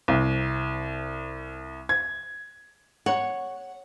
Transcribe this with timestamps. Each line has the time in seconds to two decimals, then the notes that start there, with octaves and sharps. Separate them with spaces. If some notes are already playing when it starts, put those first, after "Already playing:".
0.08 C2
1.89 G#6
3.06 C#5 F#5